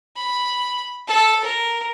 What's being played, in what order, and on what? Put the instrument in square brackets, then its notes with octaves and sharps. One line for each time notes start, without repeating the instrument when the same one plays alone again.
[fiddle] B5
A4
A#4